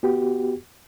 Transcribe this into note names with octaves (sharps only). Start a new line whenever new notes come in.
B3 F#4 G4